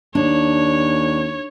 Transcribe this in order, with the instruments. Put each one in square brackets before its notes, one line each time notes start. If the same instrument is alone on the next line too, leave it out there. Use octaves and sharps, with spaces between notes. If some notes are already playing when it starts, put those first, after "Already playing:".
[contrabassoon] D#2 [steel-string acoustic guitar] D4 [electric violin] C#5